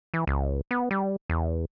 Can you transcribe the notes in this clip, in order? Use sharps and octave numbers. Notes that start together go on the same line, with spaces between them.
E3
C#2
B3
G3
E2